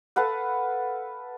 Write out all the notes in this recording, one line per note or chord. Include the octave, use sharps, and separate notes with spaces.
A4 B4 F5 F#5